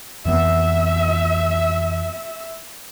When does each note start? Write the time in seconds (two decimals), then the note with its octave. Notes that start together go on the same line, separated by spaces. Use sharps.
0.25 F2 E3 B3 E5